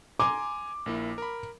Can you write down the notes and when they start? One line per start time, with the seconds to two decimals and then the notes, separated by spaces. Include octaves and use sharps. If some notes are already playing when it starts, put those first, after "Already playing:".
0.19 G#5 A#5 C6 D6
0.86 A#1 A#3 E4
1.18 A#4 B5